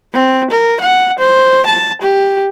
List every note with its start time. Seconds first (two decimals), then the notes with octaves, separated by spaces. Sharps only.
0.13 C4
0.51 A#4
0.81 F#5
1.19 C5
1.67 A5
2.02 G4